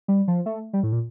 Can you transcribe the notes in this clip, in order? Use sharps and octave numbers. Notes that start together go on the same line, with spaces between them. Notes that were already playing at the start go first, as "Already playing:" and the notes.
G3
F3
A3
G3
A2
A#2